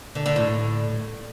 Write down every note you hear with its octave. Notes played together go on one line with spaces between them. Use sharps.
D3
D3
A2